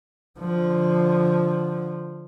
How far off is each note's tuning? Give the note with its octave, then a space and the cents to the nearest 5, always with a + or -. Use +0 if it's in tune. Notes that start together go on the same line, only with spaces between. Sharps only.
D3 +0 F3 +0